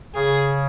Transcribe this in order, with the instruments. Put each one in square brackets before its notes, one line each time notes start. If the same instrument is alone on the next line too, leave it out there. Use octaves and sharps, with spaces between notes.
[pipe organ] C#3 [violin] G#4